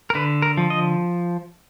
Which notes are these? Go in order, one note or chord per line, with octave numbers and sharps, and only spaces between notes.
A#4
D3 B4
A#4
F3
D#5